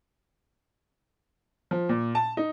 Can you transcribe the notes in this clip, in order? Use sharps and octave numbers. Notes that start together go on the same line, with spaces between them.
F3
A#2
A5
D#4